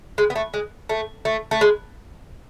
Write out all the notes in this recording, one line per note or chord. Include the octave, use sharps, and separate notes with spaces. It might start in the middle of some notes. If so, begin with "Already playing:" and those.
G#3
B3
A3
G#3
A3
A3
A3
G#3